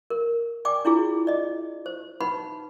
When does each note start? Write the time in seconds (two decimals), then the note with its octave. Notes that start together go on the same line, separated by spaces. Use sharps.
0.10 A#4
0.65 D5 G5 G#5 D6
0.85 D4 E4 F4 G#4
1.27 D5 D#5
1.86 C5
2.21 D#4 B4 F#5 B5